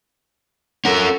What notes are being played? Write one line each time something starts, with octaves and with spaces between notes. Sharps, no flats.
C#4 F4 A4 A#4 F#5